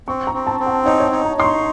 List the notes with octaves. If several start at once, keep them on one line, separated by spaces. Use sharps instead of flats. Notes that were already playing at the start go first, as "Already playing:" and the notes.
C4 C#6
A#5
C4
A5
C4
F#5
D#4 C#5
C#5
D#5
D#4
A#5
D#4 C6
C#6